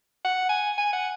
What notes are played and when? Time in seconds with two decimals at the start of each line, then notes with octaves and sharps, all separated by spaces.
0.25 F#5
0.49 G#5
0.78 G#5
0.93 F#5